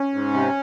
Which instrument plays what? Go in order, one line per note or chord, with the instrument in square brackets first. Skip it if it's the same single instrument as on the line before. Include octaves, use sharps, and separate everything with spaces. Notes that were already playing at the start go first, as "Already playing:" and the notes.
Already playing: [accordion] C#4
G#2
C3